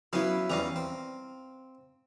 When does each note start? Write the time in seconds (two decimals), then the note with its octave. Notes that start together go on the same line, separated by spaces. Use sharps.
0.13 F#3 B3 C#4 E4 F5
0.50 E2 G3 C#4 F5 A#5
0.76 C4